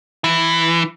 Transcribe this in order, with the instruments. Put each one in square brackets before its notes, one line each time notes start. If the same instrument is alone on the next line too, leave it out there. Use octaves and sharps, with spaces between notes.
[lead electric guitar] E3